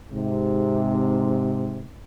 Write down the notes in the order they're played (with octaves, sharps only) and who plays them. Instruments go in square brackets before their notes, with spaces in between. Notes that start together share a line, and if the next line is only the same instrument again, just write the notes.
[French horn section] G#2 C3